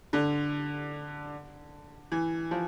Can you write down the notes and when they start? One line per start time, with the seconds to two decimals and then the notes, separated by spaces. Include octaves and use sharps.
0.13 D3
2.12 E3
2.51 F3